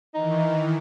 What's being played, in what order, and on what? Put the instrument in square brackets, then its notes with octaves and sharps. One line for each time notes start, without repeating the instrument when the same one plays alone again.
[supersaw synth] D#3 E3 [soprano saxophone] D#4